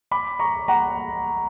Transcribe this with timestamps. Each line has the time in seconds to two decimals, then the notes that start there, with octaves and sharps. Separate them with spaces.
0.11 B5 D6
0.39 A#5 C#6
0.68 F#5 A#5